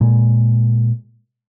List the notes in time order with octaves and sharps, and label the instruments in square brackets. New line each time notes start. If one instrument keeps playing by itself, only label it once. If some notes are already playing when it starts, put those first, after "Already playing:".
[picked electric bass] A#2 G#3